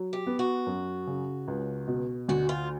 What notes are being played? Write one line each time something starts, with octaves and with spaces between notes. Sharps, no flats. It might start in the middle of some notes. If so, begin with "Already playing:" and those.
Already playing: F#3
G4
B3
F#4
F#2
C#3
C#2
B2
D2 F#4
F4